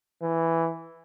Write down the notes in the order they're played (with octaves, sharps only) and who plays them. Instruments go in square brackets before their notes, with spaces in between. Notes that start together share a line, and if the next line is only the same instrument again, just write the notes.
[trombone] E3